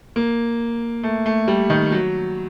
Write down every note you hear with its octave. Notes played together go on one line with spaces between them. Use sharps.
A#3
A3
A3
G3
D#3
F#3